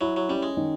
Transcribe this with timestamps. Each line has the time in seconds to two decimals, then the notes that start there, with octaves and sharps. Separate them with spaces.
0.01 F#3 E4
0.16 F#3
0.29 G3 C#4
0.43 G#3
0.57 D#3